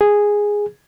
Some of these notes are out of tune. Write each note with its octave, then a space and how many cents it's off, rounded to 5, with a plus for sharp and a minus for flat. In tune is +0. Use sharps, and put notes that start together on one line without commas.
G#4 -5